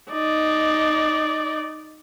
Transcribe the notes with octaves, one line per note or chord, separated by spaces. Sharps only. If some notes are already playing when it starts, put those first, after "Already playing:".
D#4 D5